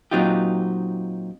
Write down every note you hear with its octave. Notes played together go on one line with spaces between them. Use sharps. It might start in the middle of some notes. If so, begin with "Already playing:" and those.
A#2 F#3 C4 D#4 F4 G4